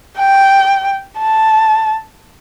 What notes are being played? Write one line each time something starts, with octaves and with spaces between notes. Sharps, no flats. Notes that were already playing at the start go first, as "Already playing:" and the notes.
G5
A5